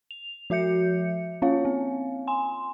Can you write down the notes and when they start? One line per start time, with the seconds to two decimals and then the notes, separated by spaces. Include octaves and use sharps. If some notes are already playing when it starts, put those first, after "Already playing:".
0.11 F7
0.50 F3 F#4 E5 G6 C#7
1.42 A#3 C#4 F4 C#5 F5
1.65 C4
2.28 G#5 C6